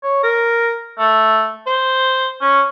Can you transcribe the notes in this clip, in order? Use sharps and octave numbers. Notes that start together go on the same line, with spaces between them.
C#5
A#4
A3
C5
C#4